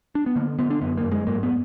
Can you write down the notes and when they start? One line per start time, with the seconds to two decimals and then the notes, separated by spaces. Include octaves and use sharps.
0.15 D4
0.26 B3
0.36 D3 A#3
0.59 D3 B3
0.70 D4
0.81 F#2 B3
0.97 A#3
1.04 F#2
1.12 G#3
1.27 G#2 A#3
1.43 B3